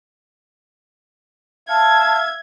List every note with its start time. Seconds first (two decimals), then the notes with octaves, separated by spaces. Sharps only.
1.69 E5 F5 A5 G#6